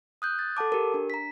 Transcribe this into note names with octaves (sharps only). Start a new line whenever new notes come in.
D#6 F#6 G6
A6
A4 F#5 A5 D6
G4 A#4
D4
A#5 B6